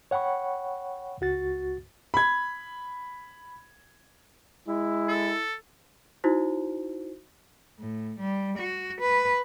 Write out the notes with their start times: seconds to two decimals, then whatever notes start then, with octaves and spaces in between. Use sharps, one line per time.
0.11 C#5 F#5 G5 B5 C#6
1.21 C#2 F#4 A6
2.14 B5 G#6
4.68 G#3 E4
5.08 A4
6.24 D#4 E4 F#4 C5
7.79 A2
8.19 G3
8.58 F#4
9.01 B4